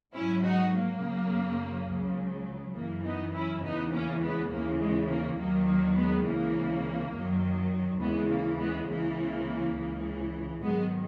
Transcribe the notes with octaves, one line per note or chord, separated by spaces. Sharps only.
G#2 F#3 C#4 E4
D#4 F#4
A#3
F#2 C#3 F#3
C#2 C#3 F#3
F#2 E3 A#3
B3 D#4
C#4 E4
E2 C#3 E3 B3 D#4
A#3 C#4
G#3 B3
D#2 C#3 E3 A#3
G#3
A#3
D#2 D#3 F#3 A#3
A#3
G#3 B3
C#2 C#3 E3 A#3
F#2 D#3 F#3
D#2 C#3 E3 G#3 B3
A#3
G#3 B3
C#2 C#3 E3 A#3
C#2 C#3 E3
G#2 D#3 F#3 G#3 B3